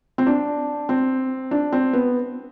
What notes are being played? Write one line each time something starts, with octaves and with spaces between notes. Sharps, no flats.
C4
D4
C4
D4
C4
B3